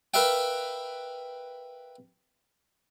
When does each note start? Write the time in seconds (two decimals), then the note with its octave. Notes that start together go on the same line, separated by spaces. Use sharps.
0.14 A#4 B4 E5 F5 G5